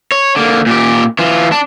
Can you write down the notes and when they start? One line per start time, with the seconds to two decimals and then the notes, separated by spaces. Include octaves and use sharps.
0.12 C#5
0.36 D3 A#3
0.66 A#2 G4
1.19 E3 F4
1.52 D4